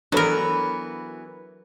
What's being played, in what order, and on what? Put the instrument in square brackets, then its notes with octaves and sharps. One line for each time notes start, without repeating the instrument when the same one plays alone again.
[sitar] E3 B3 F#4 [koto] F#3 A#4 [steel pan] D4 A4 B5